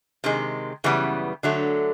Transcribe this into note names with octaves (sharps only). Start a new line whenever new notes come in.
C3 D#3 G#3
F#2 C#3 E3 G3 B3
D3 F#3 A3